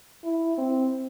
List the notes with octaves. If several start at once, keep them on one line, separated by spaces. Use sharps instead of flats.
E4
C4